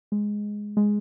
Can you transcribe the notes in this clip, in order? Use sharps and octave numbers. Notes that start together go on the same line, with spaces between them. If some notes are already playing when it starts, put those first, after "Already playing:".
G#3
G#3